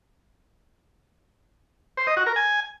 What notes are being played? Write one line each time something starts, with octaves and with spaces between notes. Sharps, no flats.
C5
D#5
F#4
A#4
G#5